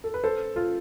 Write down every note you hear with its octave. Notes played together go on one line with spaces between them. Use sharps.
A4
B4
A4 C5
F4 A4